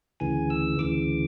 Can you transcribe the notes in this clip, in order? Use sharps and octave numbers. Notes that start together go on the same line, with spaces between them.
D2 C#3 E3 G#5
E6
D2 C#3 E3 D6